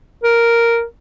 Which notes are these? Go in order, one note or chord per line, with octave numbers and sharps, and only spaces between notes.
A#4